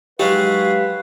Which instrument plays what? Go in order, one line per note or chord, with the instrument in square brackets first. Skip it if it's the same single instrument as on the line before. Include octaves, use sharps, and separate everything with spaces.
[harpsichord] F#3 G#3 D#4 [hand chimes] G4 [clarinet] B4 [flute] F5